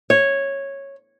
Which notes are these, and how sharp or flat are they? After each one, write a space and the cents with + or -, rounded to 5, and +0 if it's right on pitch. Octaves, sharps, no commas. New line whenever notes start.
C#5 -10